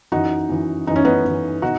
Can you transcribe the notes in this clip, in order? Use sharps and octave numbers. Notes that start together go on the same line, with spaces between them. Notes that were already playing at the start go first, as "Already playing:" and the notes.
F#2 E3 D#4 F#4
F#2 E3
F#2 E3 D#4
C#4
B3 D#4
F#2 E3
B2 D#4 F#4